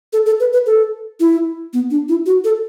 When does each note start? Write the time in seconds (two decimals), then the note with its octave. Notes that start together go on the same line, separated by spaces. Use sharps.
0.13 A4
0.26 A4
0.40 B4
0.53 B4
0.66 A4
1.20 E4
1.73 B3
1.91 D4
2.09 E4
2.26 F#4
2.44 A4